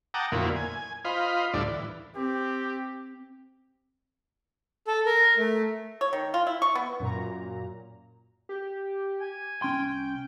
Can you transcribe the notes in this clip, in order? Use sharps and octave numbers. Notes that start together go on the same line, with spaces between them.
F#5 G5 A5 A#5 D6 D#6
F2 A#2 D3 F#3 A#3 E4
G#5
F4 C5 D#5 F5 B5
D2 A2 G3 D4 E4 D5
E3
C4 G4
A4
A#4
A3
C#5
D#3
F4
E4
C#6
B3
F#2 A#2 A#5
G4
G#5
C2 C#4 G5 C6